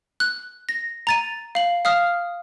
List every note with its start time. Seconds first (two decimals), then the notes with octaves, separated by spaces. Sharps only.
0.20 F#6
0.69 A#6
1.07 A#5 A6 D#7
1.55 F5 F#7
1.85 F5 D#6 F6